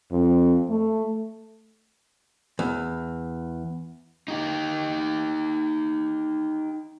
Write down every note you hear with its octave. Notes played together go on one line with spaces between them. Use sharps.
F2
A3
E2
D#4 G4